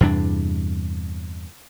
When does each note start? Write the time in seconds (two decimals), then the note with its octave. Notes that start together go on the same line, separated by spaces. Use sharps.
0.01 E2 G2 C3 D4